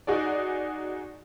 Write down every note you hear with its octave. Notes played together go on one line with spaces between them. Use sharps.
D#4 F#4 G#4 D5